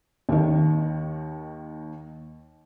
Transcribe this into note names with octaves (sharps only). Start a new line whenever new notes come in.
D#2 D#3